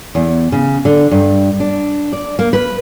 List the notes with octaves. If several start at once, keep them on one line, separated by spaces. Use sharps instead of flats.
E2
C#3
D3
G2
D4
D5
A#3
B4